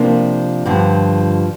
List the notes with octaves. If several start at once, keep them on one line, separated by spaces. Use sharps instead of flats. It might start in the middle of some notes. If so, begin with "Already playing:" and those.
Already playing: C3 F3 A#3 D4
G2 D3 F3